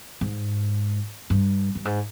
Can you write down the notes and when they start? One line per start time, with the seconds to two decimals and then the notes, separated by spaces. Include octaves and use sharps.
0.21 G#2
1.30 G2
1.75 G2
1.85 G#2